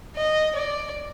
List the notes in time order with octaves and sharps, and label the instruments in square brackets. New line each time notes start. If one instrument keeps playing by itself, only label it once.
[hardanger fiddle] D#5
D5